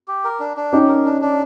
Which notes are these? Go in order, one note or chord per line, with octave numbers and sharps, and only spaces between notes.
G4
A#4
D4
D4
C#4 D#4 G4
A#4
D4
D4